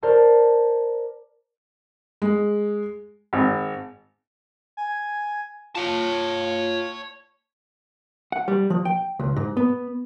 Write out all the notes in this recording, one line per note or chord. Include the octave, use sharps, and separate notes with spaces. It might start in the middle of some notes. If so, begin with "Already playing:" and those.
A#4 C5 D5 A5
G#3
G#1
G#5
F4 C#5 A5
F#5
G3
F3
G5
C#2
G#2
B3